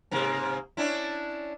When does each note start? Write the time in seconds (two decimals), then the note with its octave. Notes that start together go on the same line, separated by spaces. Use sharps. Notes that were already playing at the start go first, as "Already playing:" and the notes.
0.11 G#2 C3 A#3
0.77 C#4 D4 E4